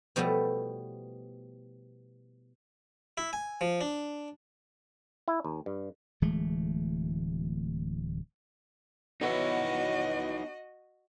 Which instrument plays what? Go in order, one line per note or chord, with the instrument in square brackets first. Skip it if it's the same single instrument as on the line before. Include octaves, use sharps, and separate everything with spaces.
[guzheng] B2 F3 G3 A3 B3 E4
[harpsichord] E4
G#5
F3
D4
[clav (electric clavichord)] E4
D#2
G2
[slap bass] D1 E3 G#3 A3
[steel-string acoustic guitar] E3 F#3 B3 [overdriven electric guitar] D#4 C#5 [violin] F#4 D#5